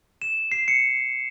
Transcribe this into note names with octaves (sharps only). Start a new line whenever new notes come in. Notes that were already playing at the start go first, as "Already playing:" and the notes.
E7
C7
C#7